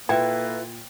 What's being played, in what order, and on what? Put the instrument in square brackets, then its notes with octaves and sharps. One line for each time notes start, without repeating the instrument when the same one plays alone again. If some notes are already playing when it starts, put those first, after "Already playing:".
[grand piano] A#2 [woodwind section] A#3 A4 B4 [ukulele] E4 [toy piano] G5